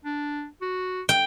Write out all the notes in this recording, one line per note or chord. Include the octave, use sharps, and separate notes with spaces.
D4
F#4
G5